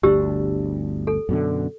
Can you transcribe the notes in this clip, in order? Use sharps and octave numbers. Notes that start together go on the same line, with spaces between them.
G1 D2 D4 G4 E6
A4
F#2 B2 D3